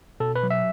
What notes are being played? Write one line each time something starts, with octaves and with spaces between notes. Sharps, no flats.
B2 A4
B4
F#3
E5